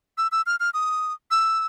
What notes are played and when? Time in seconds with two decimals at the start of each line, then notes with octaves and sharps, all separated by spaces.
0.18 E6
0.32 E6
0.46 F6
0.60 F6
0.74 D#6
1.31 E6